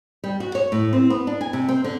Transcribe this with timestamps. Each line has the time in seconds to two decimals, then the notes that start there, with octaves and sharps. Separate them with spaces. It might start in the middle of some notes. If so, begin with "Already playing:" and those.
0.24 G3
0.40 F#4
0.55 C#5
0.72 A2
0.93 C4
1.10 B3
1.27 D4
1.41 G#5
1.53 C3
1.68 C4
1.84 D3